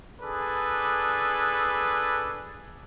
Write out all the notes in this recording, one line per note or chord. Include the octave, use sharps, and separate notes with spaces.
D4 G#4 A4 B4